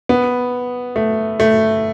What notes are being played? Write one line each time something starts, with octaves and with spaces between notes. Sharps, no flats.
B3
A3
A3